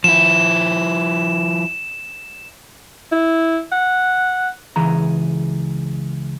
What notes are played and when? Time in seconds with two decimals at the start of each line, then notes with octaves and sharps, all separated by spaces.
0.04 F3 E4 E7
3.12 E4
3.72 F#5
4.76 C#2 E3 G#4 A#5